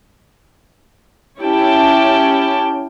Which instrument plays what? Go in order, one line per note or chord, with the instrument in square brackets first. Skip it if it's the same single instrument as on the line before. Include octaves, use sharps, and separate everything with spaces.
[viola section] C#4 E4 G4 C#5 G5 A5